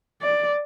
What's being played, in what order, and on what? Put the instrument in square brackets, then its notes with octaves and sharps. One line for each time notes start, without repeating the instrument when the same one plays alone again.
[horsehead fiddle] D5